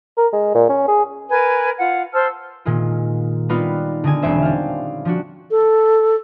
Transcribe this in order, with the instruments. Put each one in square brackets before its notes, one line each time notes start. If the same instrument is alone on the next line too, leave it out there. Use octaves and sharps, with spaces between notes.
[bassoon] A#4
G#3
A#2
C#4
G#4
[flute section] A#4 B4 G#5
F4 F#5
C5 A5 E6 F6
[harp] A#2 D#3 G#3 F4
G3 B3 D#4 F4 B4
D3 D#4 G#4 G#5
E1 G#3 C4 C#4 C5 E5
G3 F5
F3 D4 F#4
[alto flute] A4